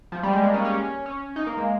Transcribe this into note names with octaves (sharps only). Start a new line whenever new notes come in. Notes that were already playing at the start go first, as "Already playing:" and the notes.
F3
G3
G#3
A#3
C#4
C#4
C#4
D#4
A#3
G#3